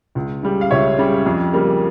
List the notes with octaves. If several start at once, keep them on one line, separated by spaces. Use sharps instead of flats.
C#2
C#3 G3
F5
C#2 C#5 E5
C#3 G3
F2
C#3 G3 A#3